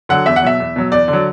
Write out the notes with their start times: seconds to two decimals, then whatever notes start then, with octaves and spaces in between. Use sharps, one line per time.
0.09 D3 F#3 F#5
0.26 E2 E5
0.36 F#5
0.42 B2 F#3 E5
0.60 E2
0.76 B2 F#3
0.92 E2 D5
1.08 D3
1.13 F#3